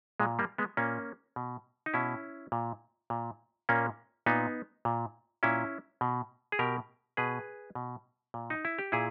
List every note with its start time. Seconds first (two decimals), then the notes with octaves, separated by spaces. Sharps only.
0.20 A#2 G#3
0.39 G3 A#3
0.58 G#3 B3
0.77 A#2 A#3 C#4
1.36 B2
1.86 D#4
1.94 B2 C#4 E4
2.52 A#2
3.10 A#2
3.69 A#2 A#3 C#4
4.26 A#2 B3 D#4
4.85 A#2
5.43 A#2 C#4 E4
6.01 B2
6.52 G#4
6.59 B2 G4 A#4
7.17 B2 G#4 B4
7.75 B2
8.34 A#2
8.50 D#4
8.65 E4
8.79 G4
8.92 A#2 E4 G#4